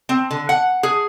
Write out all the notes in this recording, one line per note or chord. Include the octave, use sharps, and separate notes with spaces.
C4
D3
F#5
G#4